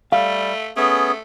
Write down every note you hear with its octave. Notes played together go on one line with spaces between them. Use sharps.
G3 A3 F5
A3 B3 C#4 G#4